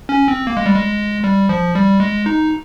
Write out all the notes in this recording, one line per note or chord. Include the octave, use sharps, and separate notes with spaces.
C#4
C4
A#3
G#3
G3
G#3
G3
F3
G3
G#3
D#4